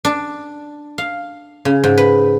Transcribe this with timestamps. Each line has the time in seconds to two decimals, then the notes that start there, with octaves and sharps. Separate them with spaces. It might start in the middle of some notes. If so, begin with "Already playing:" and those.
0.05 D4
0.98 F5
1.65 C#3
1.84 G#2
1.98 B4